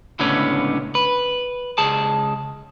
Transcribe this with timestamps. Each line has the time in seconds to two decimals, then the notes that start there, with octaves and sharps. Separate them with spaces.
0.19 C#2 A2 D3 B3 C#4
0.95 B4
1.78 C#2 G#4 A5